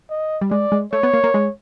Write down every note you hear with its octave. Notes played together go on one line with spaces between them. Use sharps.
D#5
G3
G#3 D5
G#3
A3 C#5
B3
A#3
A#3
G#3